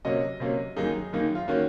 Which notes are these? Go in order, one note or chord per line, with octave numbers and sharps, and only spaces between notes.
C3 F#3 A#3 C#4 D#5
C3 F#3 A#3 C#4
F#2 D#3 A#3 D#4 G#4
F#2 D#3 A#3 D#4
F4
D#3 A#3 C#4 F#4